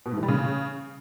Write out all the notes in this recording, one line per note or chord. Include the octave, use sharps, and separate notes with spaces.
B2
G#2
E3
G3
C#3